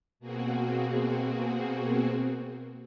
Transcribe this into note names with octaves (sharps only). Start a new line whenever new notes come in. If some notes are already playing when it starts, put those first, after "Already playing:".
B2 A#3 C4 F#4 G#4